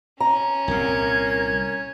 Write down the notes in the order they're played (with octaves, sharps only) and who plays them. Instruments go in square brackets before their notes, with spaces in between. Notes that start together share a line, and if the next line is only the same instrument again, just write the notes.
[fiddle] C#4 [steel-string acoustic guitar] A#5
[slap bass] C2 A#2 [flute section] A#4 G#6